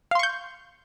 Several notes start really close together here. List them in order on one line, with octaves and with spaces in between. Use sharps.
F5 C6 C#6 G6